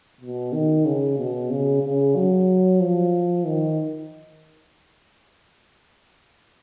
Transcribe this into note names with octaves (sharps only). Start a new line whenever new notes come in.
B2
D#3
C#3
B2
C#3
C#3
F#3
F3
D#3